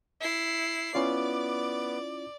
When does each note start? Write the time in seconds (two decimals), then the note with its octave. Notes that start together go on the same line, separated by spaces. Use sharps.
0.20 E4 C7
0.95 B3 C#4 E4 F4 D5 D6